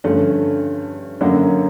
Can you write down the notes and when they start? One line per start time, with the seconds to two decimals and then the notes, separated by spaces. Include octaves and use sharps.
0.04 G2 D3 F3 A3 C#4
1.21 F#2 D3 F#3 A#3 C#4